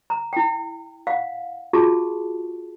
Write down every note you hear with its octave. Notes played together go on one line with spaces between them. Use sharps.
A#5
E4 G5
F5 F#5
F4 F#4 G#4 A5 C#6